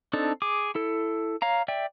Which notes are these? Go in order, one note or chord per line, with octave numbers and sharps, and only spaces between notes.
C4 D4 D#4 A4
G#4 D6
E4 A4
C#5 F5 A#5
D5 E5 G5